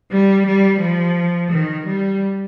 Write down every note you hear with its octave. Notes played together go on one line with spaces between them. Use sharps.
G3
G3
F3
D#3
G3